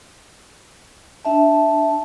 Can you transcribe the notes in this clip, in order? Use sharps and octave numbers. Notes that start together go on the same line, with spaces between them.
D4 E5 A5